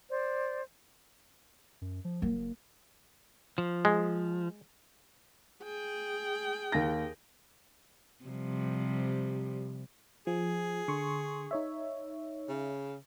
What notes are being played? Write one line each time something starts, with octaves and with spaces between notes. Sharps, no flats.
C5 D5
F#2
F3
F#1 F#3 A#3
F3
G#3
G#4 G5
D#2 A#6
C3 F3 G3
F3 G#4
D3 C6 C#6
D#4 C#5 E5
C#3